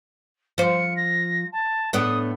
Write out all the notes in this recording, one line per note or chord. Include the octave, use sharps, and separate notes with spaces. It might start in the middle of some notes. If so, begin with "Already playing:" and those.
F3 C5 C#7
A#6
A5
A2 B3 D4 D#6